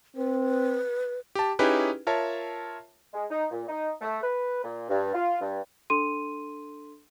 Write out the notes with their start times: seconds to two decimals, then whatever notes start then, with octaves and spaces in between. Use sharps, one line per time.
0.16 C4 B4
1.35 G4 A5
1.59 C#4 D#4 E4 G4 G#4 B4
2.07 F4 A#4 C#5 E5 A5
3.14 G#3
3.31 D#4
3.51 A#2
3.69 D#4
4.01 A3
4.23 B4
4.64 A#2
4.90 G2
5.14 F4
5.41 G2
5.90 D4 A4 C6 D#7